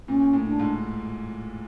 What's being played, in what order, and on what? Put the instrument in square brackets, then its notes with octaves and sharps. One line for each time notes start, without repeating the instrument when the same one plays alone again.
[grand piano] A#2 [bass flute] C#4
[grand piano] A2
[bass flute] D4
[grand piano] G#2